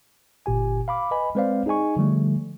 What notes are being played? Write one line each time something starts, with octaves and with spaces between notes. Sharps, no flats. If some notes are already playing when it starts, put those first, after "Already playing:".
G1 A#2 G4 G#5
F5 B5 D6
B4 D#5 G#5 B5
G#3 C4 B4 C5 D5 F5
D#4 G#4 D#5 G#5 C#6
D3 F3 G3 A3